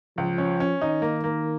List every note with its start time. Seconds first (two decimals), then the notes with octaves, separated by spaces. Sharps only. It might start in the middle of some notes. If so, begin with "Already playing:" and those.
0.17 C#2 F3
0.38 C#4
0.60 C#4
0.81 D#3 D#4
1.02 A#3
1.24 A#3